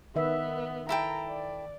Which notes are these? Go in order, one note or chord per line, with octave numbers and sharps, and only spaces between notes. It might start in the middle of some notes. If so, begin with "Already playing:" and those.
D#3 B3 B4 E5
E4 A4 G5 A#5
D5